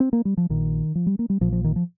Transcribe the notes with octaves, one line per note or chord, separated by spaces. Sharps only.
C4
A#3
G3
F3
A#1 A#2 D#3
F3
G3
A#3
G3
A#1 A#2 F3
F3
D#3
F3